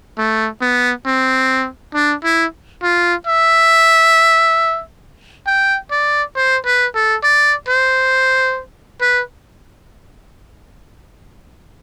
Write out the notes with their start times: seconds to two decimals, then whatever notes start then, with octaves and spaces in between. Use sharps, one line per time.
0.18 A3
0.61 B3
1.06 C4
1.94 D4
2.24 E4
2.83 F4
3.27 E5
5.47 G5
5.91 D5
6.36 C5
6.66 B4
6.95 A4
7.24 D5
7.68 C5
9.01 B4